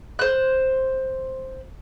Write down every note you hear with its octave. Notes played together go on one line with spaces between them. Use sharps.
C5 F#6